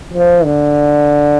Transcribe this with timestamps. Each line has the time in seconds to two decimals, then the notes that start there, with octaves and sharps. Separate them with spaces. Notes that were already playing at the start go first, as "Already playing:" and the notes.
0.13 F3
0.45 D3